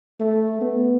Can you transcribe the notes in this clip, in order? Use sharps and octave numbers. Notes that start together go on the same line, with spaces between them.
A3
B3